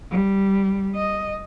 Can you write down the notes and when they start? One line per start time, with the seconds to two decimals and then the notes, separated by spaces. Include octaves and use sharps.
0.10 G3
0.96 D#5